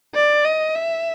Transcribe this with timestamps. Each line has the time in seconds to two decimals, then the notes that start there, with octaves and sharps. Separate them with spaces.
0.15 D5
0.45 D#5
0.75 E5